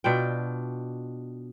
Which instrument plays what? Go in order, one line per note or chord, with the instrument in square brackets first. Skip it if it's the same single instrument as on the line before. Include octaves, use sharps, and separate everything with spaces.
[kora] B2 D4 F4 G5